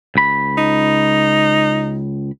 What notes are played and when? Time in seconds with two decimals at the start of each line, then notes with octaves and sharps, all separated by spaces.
0.16 C#2 B5
0.58 D#4